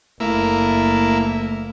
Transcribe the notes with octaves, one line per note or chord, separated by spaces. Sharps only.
F#1 A3 A#3 E4